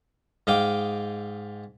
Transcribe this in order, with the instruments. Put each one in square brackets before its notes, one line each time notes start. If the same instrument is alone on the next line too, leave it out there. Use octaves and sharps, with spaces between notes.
[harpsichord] G#2 D#5 F5 G5 D6